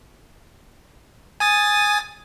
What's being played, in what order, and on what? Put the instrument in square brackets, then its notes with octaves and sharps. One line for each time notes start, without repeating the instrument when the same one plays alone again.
[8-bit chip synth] G#5 D#6 A6